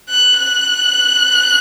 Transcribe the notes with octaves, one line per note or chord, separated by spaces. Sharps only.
F#6
F#6